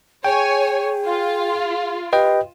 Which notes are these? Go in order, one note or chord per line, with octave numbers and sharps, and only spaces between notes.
G#4 C#5 G5 G#5
F4
G4 B4 D#5 G5